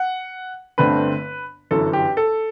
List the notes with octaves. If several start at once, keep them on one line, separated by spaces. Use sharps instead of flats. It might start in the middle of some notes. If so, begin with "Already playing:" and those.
Already playing: F#5
G1 G2 D3 A3 C4 B4
G1 F#2 E3 A4
G4
A4